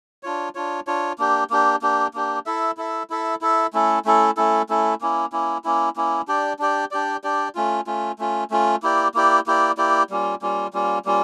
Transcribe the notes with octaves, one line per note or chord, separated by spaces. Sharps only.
D4 F4 C#5
D4 F4 C#5
D4 F4 C#5
A#3 D4 G4
A#3 D4 G4
A#3 D4 G4
A#3 D4 G4
E4 A4 E5
E4 A4 E5
E4 A4 E5
E4 A4 E5
A3 C#4 E4 A4
A3 C#4 E4 A4
A3 C#4 E4 A4
A3 C#4 E4 A4
A#3 C#4 E4
A#3 C#4 E4
A#3 C#4 E4
A#3 C#4 E4
D4 G4 D5
D4 G4 D5
D4 G4 D5
D4 G4 D5
A3 C#4 F4
A3 C#4 F4
A3 C#4 F4
A3 C#4 F4
A#3 E4 G4 D5
A#3 E4 G4 D5
A#3 E4 G4 D5
A#3 E4 G4 D5
G3 A#3 C#4 F4
G3 A#3 C#4 F4
G3 A#3 C#4 F4
G3 A#3 C#4 F4